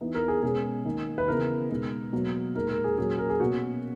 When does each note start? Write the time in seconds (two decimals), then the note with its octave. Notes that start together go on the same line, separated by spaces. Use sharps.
0.01 E3 B3 D#4
0.14 A#4
0.28 G#4
0.43 B2 G#3 C#4 G#4
0.85 D#3 A#3 D#4
1.18 B4
1.28 C#3 E3 B3 A#4
1.70 B2 G#3 B3 D#4
2.13 B2 F#3 A#3
2.55 A#2 G#3 D#4 A#4
2.69 A#4
2.84 G#4
2.98 A#2 F#3 C#4 G#4
3.18 A#4
3.30 G#4
3.40 B2 A#3 C#4 F#4